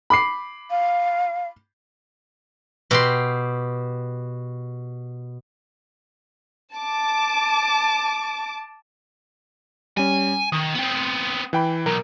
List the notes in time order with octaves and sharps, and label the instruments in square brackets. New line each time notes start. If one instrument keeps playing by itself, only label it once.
[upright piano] B5 D6 C7
[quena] F5
[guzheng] B2 G4 C6
[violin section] A5 D6
[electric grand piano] G3 C#4 [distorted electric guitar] G#5
[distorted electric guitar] D#3 [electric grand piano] D#6
[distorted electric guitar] B3 C4
[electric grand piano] E3 G5 B5
[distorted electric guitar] B1 [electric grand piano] A#4